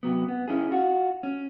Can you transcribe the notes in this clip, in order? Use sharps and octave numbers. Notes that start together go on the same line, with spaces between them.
C3 F#3 B3
B3
C#4 E4 G#4
F4 F#4
C#4